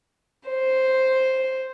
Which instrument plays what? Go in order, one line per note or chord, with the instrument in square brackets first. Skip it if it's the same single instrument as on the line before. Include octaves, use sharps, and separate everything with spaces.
[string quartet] C5